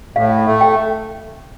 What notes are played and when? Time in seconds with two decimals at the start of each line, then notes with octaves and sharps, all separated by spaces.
0.16 A2 F5
0.46 A3
0.61 G5